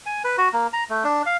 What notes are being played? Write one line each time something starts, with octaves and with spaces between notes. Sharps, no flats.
G#5
B4
F#4
A#3
A#5
A3
D4
F5